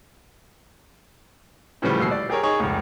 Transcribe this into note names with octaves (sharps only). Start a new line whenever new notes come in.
A2 C#3 E3 F3 G3 A3
D#2 B2 E6 C7
D5
G4 G#4 A#4 C#5
D#4 G#4 C#5 C#6
F1 C#2